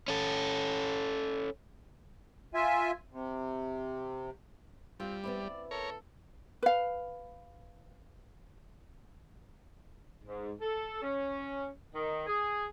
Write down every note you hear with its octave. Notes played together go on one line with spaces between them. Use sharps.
C#4 A4
F4 E5 G#5
C3
G3 C4 F4
B3 C4 E4 D5
A4 A#4 C#5
B4 F5
G#2
A4
C#4
D#3
G#4